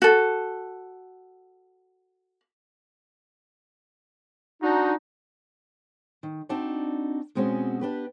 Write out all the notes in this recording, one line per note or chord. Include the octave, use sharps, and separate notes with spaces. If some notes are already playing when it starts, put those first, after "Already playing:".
F#4 A4
D4 D#4 F#4
D#3
C4 D4 D#4 F#4 D5 A5
B2 G#3 C4 C#4 F#4
D4 G4 B4